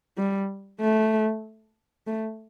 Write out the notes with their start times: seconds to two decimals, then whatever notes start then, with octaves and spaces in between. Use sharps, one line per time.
0.17 G3
0.80 A3
2.07 A3